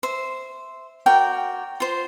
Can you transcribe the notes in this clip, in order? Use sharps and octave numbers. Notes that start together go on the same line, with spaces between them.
C5 E5
F#4 A#4 D5 G5
F4 C5